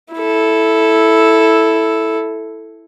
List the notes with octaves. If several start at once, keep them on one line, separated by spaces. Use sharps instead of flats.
E4 A4